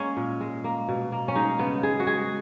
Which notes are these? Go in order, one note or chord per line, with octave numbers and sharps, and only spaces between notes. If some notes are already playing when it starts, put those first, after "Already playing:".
Already playing: G#3 A#3 C#4
A#2
G#3
A#3
B2
A#3
C#4
G#3 D#4
C#3 B3
G#3 G#4
F#4
G#3 G#4